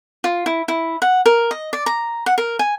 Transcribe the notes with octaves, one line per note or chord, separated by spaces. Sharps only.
F4
E4
E4
F#5
A#4
D#5
D5
A#5
F#5
A#4
G#5